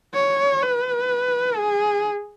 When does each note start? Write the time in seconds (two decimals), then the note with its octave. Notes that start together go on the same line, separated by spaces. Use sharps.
0.14 C#5
0.62 B4
1.58 G#4